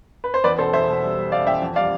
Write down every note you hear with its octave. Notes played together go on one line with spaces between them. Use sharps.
B4
C5
E2 B4 D5
B2 A4 C5
E2 C5 E5
B2
G3
G3
G3 D5 F5
E2 E5 G5
F2
G3 D5 F5